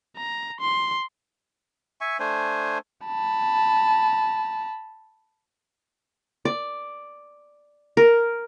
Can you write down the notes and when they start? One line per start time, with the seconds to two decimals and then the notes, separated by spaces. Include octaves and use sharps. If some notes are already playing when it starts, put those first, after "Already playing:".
0.16 A#5
0.61 C6
2.01 E5 G#5 C#6
2.19 A3 D4 C5 G#5
3.06 A5 B5
6.45 D5
7.97 A#4